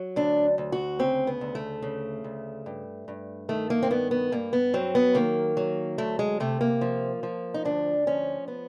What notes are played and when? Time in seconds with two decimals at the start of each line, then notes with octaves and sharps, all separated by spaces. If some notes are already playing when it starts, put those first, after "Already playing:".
Already playing: F#3
0.16 D2 D4
0.58 D2
0.72 F#4
0.99 C#3 C4
1.27 B3
1.41 D2
1.55 A3
1.82 C#3
2.24 D2
2.66 G2
3.08 G2
3.49 D#3 A3
3.70 A#3
3.83 C4
3.90 G2 B3
4.11 B3
4.32 G2 A#3
4.53 B3
4.74 F#3 C4
4.95 B3
5.15 D#3 A#3
5.57 F#3
5.98 D2 A3
6.19 G#3
6.40 C3 A3
6.61 A#3
6.81 F3
7.23 F3
7.54 D#4
7.65 D2 D4
8.07 F3 C#4
8.48 B3